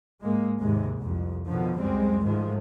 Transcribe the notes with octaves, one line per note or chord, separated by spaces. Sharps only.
G#2 G#3 A#3
D#2 G#2 C3 G#3
C2 F2
B2 D3 D#3 F3
C#2 F#2 G3 G#3 C4
G#2 D#3 F3 G#3 A3